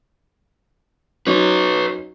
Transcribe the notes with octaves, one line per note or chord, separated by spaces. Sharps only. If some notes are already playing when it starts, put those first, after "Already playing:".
F#3 C#4 D#4 B4 C#5